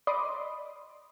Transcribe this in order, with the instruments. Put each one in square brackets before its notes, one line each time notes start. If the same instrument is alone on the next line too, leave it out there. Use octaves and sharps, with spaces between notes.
[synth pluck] D5 D#5 B5 C6 D6 D#6